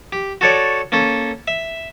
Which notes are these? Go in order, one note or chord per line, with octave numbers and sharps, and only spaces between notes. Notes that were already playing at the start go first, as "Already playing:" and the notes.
G4
F#4 A4 C#5 D5
A#3 C#4 A4
E5